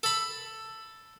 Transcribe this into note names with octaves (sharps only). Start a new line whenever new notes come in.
A4 B5